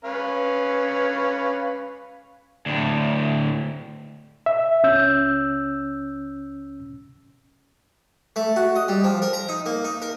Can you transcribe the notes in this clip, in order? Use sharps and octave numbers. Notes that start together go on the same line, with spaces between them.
C#4 B4 F5
D2 A2
E5
C#2 C#4 E6 G6
A3
F#4
D#5
G3
F3
A#4
A#5
D#4
A#3
D#4
A#4